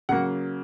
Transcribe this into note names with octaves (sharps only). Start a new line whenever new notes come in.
C#3 F#3 A#3 F#5